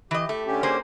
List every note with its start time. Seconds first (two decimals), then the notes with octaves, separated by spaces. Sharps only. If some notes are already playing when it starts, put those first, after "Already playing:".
0.11 E3 G4 D#5
0.29 A3
0.46 D3 C#4 G4
0.63 A#3 G#4 C5